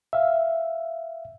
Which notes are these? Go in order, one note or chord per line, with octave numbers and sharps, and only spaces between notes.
E5 F5